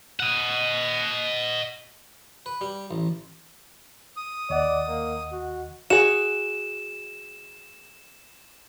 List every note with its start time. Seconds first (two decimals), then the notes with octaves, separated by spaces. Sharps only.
0.20 D#5 F#5
2.46 B4
2.61 G3
2.91 A1
4.17 D#6
4.50 D#2 D5 D#5 F#5
4.88 A#3
5.32 F#4
5.90 F#4 G#4 E7